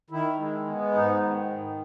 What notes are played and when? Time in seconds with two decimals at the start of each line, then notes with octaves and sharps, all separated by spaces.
0.10 D#3 E4
0.39 G#3
0.67 B3
0.94 G#2 D#4
1.21 D#3